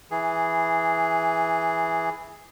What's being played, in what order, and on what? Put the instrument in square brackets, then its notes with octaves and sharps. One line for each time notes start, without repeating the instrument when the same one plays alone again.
[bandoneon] E3 G#4